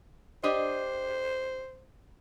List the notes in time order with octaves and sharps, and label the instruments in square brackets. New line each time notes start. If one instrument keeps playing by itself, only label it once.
[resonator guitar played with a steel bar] D4 G4 D#5 [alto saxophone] C5